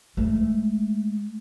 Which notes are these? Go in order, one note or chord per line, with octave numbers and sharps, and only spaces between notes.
G#3 A3